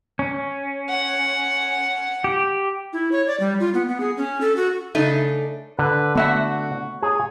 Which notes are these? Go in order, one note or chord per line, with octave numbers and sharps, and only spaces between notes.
C#4
F#5
G4
E4
C#5
D5
G3
F4
B3
B3
G#4
C#4
A4
F#4
C#3 A3 D4 D#4
D3 B4
A3 B3 F#4 E5 F#5
G#4 C#5